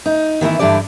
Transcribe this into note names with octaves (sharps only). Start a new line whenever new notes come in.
D#4
D#3 E3 B3 E4
G2 D3 E3 G3 D5